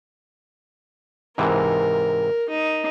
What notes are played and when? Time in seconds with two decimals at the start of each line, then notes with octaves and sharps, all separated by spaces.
1.38 G#2 C3 E3 A#4
2.49 D#4